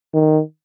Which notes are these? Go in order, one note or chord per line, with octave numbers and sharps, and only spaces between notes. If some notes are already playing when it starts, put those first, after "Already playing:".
D#3